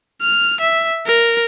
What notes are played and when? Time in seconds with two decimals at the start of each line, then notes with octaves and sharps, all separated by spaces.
0.21 F6
0.61 E5
1.06 A#4